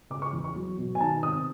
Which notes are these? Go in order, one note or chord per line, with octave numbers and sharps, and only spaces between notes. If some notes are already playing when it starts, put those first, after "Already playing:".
C#3 D6
C#6
E2
C#6
F#3
B2
G#5
D#3 A5
C3 D#6